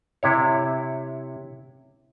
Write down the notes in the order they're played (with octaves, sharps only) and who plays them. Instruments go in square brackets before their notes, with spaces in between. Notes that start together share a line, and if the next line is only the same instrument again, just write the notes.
[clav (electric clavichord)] C3 E4 C#5